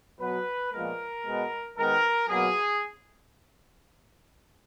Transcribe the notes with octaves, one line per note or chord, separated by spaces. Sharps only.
B2 F#3 B3 B4
A#2 F3 G#3 B3 A#4
B2 G#3 B3
D#3 G#3 B3 A#4
B2 F#3 A#3 G#4